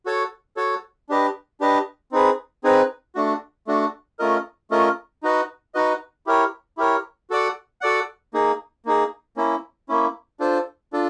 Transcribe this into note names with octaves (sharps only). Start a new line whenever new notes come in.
F#4 A4 C#5
F#4 A4 C#5
D4 G4 B4 D#5
D4 G4 B4 D#5
C4 D#4 G#4 B4
C4 D#4 G#4 B4
A3 D4 F#4
A3 D4 F#4
A3 C#4 F4 A#4 D#5
A3 C#4 F4 A#4 D#5
D#4 F#4 B4 D#5
D#4 F#4 B4 D#5
E4 G4 A#4 C#5
E4 G4 A#4 C#5
F#4 A4 D5 F#5
F#4 A4 D5 F#5
A#3 D#4 G#4
A#3 D#4 G#4
A#3 C#4 E4
A#3 C#4 E4
D4 F4 A4 C5
D4 F4 A4